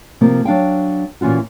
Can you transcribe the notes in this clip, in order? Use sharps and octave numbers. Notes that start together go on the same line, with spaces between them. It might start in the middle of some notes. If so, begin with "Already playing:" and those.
C3 F3 A#3
F#3 D4 F5 G5
A#2 E3 C#4 F4 F#4